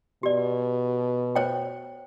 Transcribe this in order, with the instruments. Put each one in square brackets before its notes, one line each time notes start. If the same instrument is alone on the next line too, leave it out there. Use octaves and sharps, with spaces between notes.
[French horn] B2 [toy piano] G4 D5
[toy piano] C5 C#5 G5